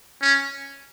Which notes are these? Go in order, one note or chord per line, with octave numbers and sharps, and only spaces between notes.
C#4